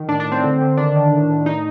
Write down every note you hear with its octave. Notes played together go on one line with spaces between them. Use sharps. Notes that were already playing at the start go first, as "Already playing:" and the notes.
Already playing: D#3
A2 D4
D4
A2
C4
D3
D3
D#3 D4
D#3
A2
A2
A2 D#4